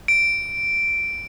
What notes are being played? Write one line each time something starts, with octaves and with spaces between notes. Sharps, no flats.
D7